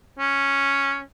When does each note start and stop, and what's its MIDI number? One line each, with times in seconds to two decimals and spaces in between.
0.19 1.00 61